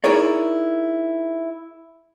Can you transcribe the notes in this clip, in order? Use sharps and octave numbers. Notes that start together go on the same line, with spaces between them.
D#4 E4 G#4 A#4 C#5 D5